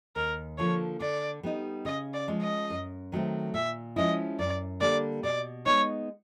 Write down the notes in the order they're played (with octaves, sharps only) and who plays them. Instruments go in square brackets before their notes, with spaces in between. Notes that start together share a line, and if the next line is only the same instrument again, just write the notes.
[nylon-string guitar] D#2 [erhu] A#4
[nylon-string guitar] D3 F3 A#3 [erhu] C#5
[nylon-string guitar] D3 [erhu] D5
[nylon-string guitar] G3 B3 D#4
[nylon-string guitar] C#3 [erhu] D#5
[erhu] D5
[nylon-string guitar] F3 G#3 C#4
[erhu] D#5
[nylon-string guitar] F#2
D#3 F#3 A3 C4
[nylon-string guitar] A#2 [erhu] E5
[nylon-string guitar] F3 G#3 C#4 E4 [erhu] D#5
[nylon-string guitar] F#2 [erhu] D5
[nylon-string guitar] D3 G3 A#3 D4 [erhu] D5
[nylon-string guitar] B2 [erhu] D5
[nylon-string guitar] G#3 B3 D#4 [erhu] C#5